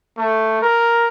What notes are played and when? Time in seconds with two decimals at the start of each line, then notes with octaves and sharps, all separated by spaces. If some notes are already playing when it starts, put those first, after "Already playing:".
0.17 A3
0.62 A#4